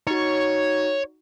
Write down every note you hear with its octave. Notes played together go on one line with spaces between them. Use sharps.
D#4 F#4 C#5